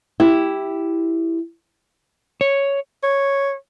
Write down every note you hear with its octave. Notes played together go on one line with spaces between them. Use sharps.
E4 G4
C#5
C#5